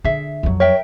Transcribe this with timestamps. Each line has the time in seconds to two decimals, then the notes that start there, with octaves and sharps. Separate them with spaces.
0.04 D3 G#4 E5
0.43 F2 F#3
0.60 A#4 C#5 E5 G5